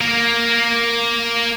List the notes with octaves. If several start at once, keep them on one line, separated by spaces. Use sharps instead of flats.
A#3 A#4